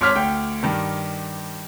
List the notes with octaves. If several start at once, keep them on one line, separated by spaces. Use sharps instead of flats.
G#1 C#5 C6 D6 F6 B6
D2 G5
G2 D#3